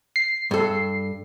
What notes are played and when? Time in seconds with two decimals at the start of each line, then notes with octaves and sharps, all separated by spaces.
0.16 C7
0.51 G2 A4